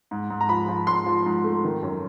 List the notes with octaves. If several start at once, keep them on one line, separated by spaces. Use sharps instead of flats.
G#2
G#2
A#5
F3 B5
F3
G#2 C6
F3
G#2
A3
D#3
F#2